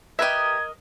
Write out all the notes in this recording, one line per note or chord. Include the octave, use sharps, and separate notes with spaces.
G4 A#4 B4 D#5 E5 G#6